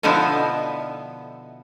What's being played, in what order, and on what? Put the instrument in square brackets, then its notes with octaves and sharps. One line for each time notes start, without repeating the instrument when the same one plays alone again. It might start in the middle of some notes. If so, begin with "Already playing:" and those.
[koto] B2 D3 F3 B3 D#4 E4